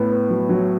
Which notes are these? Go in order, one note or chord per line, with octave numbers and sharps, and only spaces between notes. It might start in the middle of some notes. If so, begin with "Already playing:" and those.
Already playing: A2 B3
B3
F#3
F#3